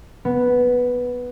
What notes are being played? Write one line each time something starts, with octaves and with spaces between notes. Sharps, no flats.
B3